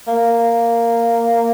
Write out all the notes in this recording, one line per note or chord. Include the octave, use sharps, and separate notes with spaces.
A#3